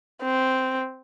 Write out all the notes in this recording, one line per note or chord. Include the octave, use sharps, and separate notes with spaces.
C4